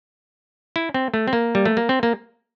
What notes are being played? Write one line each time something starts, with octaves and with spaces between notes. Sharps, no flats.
E4
C4
A3
C4
A#3
G3
A3
A#3
C4
A#3